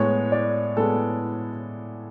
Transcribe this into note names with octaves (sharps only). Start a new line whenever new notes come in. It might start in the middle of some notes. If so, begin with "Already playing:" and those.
Already playing: A2 G#3 B3 C#5
D5
A2 G#3 B3 A4